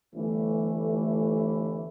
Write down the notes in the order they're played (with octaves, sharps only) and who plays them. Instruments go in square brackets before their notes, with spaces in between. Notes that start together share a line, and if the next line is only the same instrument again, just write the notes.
[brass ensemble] G1 E3 A3